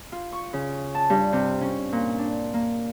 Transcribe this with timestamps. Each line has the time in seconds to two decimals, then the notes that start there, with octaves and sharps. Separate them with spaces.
0.12 F4
0.33 C#6
0.53 C#3
0.95 A5
1.10 G2
1.33 C3
1.61 C#4
1.92 A#2
2.18 D4
2.54 A#3